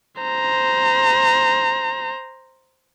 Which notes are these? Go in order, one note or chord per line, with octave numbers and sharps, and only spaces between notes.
C5 A#5